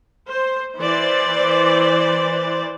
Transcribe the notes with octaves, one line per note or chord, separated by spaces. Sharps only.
C5
E3 C5 D5